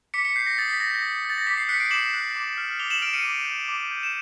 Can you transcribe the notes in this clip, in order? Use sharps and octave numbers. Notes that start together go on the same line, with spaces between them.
D6 B6 C#7
B6 C#7
G6 C7
A#6
D#6 A6
B6
G6 A#6
A#6
D#6
G6 A6
A#6
D6 B6
C7
F#6 B6 C#7
C7 D7
D6 E7 F#7
F#6
D6
F6
D6 F7 G7
E7 F#7
F6 D7 E7
C#7 D#7
D6
G6
D6
G6
E7